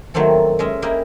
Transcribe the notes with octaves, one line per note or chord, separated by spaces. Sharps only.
D#3 F#3 A3 A#3 C4 A4
G#3 C#4 D#5 E5
A#3 E4 G4 A#4 D#5